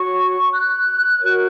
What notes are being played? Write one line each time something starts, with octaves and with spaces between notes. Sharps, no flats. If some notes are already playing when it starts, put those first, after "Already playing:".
Already playing: F#4 C#5 C#6
F#6
F#4 A#4 C#5